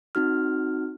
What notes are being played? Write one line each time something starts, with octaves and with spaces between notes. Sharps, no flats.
C4 D#4 F#4 F6